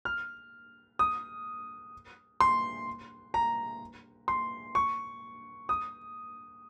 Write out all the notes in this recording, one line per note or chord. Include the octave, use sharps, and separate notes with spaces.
F6
D#6
C6
A#5
C6
C#6
D#6